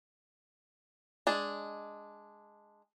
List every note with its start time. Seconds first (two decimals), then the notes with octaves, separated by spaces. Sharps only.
1.27 G#3 D4